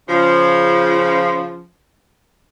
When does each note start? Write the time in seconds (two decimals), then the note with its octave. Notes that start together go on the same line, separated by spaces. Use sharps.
0.08 C#3 F3